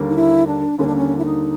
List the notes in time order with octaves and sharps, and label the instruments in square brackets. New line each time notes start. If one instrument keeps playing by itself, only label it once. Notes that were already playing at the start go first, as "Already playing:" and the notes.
Already playing: [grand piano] D#2 D3 G3 A#3
[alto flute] D#4
E4
D4
[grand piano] D#2 D3 G3 A#3 [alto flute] C#4
[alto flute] D4
C#4
E4
D#4